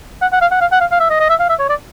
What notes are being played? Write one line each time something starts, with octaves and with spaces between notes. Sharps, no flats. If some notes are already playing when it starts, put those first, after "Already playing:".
F#5
F#5
F5
F#5
F5
F#5
F5
F5
E5
D#5
D#5
E5
F5
E5
C#5
D5